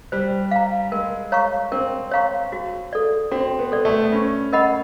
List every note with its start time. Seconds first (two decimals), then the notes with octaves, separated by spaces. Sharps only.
0.12 G3 C5
0.51 F5 A#5
0.92 G#3 A#4
1.32 C#5 F5 A#5 C#6
1.72 C4 A#4
2.11 C#5 F5 A#5 C#6
2.52 F#4
2.93 A4 D5
3.31 C4 F#4
3.59 B3
3.72 A4 D5
3.85 A3
4.12 C#4 F4
4.53 A#4 D#5 F#5 B5